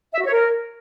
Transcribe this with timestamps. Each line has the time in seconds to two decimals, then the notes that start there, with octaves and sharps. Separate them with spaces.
0.14 E5
0.20 F#4
0.26 C#5
0.32 A#4